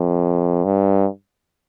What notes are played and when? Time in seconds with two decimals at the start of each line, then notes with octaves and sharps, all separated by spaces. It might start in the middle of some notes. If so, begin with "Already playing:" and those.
Already playing: F2
0.65 G2